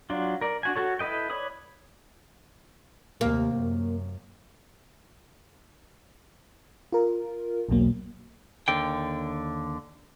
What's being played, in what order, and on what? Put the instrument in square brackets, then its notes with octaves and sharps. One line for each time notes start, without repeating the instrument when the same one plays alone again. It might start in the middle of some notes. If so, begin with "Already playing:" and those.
[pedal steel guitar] F#3 D4 F4
A#4 D5
D4 F#4 G#5
F#4 A4 C#5
E4 A4 B4 D#5 G5
B4 C#5 D5 B5 D#6
[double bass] D#2 C3 [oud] A#3
[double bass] F#2
[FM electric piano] F4 A#4
B1 E2 B2 F#3 A#3
[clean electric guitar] D#2 D3 G5